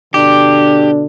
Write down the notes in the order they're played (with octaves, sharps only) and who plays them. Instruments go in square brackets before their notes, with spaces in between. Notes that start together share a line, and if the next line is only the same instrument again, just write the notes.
[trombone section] B2 D3 D4 [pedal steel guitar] G4